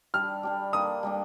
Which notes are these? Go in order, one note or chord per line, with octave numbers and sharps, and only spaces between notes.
G3 D4 G4 F6
G3 D4 G4
G3 A#3 D4 D#6
G3 A#3 D4